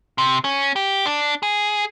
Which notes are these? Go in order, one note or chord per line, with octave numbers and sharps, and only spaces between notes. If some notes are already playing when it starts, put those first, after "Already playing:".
C3
C#4
G4
D4
G#4